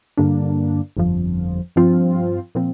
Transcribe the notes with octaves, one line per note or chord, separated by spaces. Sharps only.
G2 D3 A#3 D4
G1 F2 F3
G2 F3 C4 F4
A#2 F3 C4